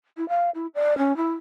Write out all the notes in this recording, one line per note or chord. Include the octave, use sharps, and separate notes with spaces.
E4
F5
E4
D5
C#4
E4